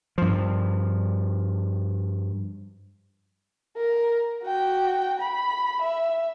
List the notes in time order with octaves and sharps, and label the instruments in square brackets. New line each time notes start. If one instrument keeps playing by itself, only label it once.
[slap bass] G2 F3
[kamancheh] A#4
F#4 G5
B5
E5